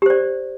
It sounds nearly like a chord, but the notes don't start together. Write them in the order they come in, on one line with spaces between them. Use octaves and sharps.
G4 C5 D5